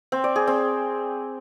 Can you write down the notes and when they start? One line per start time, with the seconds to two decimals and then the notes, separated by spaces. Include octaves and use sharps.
0.12 C4
0.24 D5
0.36 G#4
0.47 C4